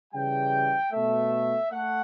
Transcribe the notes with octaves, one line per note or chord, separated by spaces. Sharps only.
C#3 E3 G3 G5
B2 A3 E5
A3 F#5